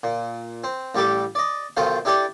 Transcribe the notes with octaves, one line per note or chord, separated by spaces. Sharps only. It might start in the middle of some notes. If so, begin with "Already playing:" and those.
A#2
C4
A1 G3 G4 A4 D6
D5 D#5
B1 D#3 A3 F4 C5
D4 E4 G4 A4 D5